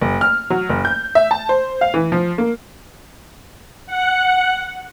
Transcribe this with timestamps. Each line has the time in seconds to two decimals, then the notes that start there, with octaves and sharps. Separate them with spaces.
0.01 F#1
0.21 F6
0.50 F#3
0.69 F#1
0.85 G6
1.15 E5
1.31 A5
1.49 C5
1.81 F5
1.94 E3
2.12 F3
2.38 A#3
3.86 F#5